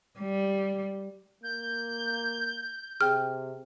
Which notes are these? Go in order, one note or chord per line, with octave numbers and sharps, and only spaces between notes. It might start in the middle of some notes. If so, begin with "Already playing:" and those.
G3
A#3 G6
C3 G#4 G5 F6